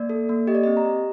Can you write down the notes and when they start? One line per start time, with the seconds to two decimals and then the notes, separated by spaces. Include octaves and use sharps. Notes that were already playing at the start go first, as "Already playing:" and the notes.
Already playing: A#3 D5
0.10 A4
0.29 A#3
0.47 G4 D#5
0.55 D5
0.64 C4 D#5
0.77 A#5
0.85 G4